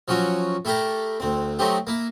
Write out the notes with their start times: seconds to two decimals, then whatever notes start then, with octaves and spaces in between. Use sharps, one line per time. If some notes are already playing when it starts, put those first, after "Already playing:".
0.08 F3 F#3 C#4 F#4
0.65 A3 E4 G4 A4 A#4
1.20 D2 C4
1.59 F#3 A3 C4 D#4 G4
1.87 A#3 E4